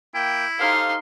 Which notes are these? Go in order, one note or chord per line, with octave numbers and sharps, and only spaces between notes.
A#3 E4 G5
D#4 G4 A4 C5 F5 C6